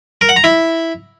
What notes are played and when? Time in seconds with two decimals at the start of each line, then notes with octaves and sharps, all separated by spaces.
0.21 A#4
0.29 F#5
0.36 A#5
0.44 E4